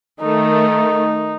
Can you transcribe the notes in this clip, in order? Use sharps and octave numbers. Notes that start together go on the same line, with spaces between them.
D#3 A3 D#4